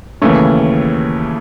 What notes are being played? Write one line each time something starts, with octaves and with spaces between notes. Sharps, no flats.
D#2 C#3 E3 A3 C#4